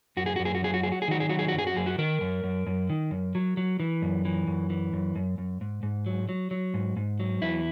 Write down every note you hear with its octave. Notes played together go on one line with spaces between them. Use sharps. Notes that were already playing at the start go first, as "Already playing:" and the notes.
F#2 F#4
G#4
F#2 F#4
G#4
F#4
F#3 G#4
F#4
F#3 G#4
F#4
G#4
D#3 F#4
G#4
F#3 F#4
G#4
F#4
F#2
G#4
F#4
F#2 G#4
F#4
D#3 A#4
F#2
F#2
F#2
D#3
F#2
F#3
F#3
E3
F#2
E3
F#2
E3
F#2
F#2
F#2
G#2
G#2
F#3
F#3
F#3
G#2
G#2
F#3
E2 E4